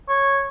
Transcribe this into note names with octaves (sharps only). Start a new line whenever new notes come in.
C#5